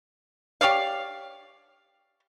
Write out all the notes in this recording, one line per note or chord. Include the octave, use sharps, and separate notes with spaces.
G4 C#5 D5 F5